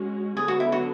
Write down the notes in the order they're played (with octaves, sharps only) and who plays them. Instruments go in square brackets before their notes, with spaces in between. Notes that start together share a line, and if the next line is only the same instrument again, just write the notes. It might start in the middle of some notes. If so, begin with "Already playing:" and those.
Already playing: [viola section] G#3 C#4 F#4
[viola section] D3 F#3 B3 [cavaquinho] G#4
[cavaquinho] F#4
E4
F#4